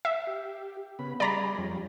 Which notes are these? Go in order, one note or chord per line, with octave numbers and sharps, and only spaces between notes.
E5
G4
C#3 B3 B5
G3 G#4 D5 A#5 B5
F2 G3 C#4